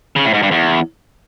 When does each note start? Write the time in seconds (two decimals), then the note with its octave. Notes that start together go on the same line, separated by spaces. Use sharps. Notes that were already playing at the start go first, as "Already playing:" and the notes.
0.16 C#3
0.25 A2
0.34 G#2
0.43 G2
0.51 E2